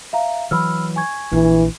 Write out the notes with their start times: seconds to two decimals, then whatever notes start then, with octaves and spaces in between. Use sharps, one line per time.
0.13 E5 F5 A#5
0.51 E3 F#3 B5 E6 F6
0.96 G#5 C#6 G#6
1.33 A#1 E3